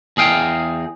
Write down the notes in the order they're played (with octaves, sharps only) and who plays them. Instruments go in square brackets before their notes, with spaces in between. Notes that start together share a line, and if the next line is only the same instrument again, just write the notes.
[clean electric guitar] E2 G#4 F5 G5